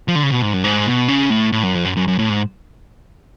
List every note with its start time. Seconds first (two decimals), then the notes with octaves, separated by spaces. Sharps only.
0.08 F3
0.15 D3
0.23 C#3
0.31 B2
0.42 G#2
0.53 F#2
0.64 G#2
0.86 B2
1.08 C#3
1.30 A2
1.52 A2
1.63 F#2
1.75 F2
1.85 F#2
1.97 F#2
2.08 F#2
2.19 A2
2.30 G#2